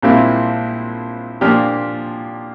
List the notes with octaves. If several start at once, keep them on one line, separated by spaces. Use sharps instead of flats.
A#1 A#2 G3 C4 E4
A#2 F3 A#3 D4 G4